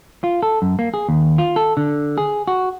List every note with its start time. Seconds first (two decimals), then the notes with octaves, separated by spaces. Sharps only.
0.24 F4
0.43 A4
0.62 F#2
0.79 A#3
0.94 G#4
1.09 D#2
1.38 F4
1.56 A4
1.77 D3
2.18 G#4
2.48 F#4